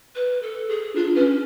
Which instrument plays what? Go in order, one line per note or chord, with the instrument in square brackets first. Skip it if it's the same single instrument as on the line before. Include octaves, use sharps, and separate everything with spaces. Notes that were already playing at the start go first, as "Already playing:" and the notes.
[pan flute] B4
A4
G#4
[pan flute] D4 [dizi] F4
[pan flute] C#4 [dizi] B4